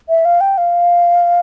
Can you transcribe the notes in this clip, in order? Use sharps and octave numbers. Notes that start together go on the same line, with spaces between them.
E5
F5
G5
F5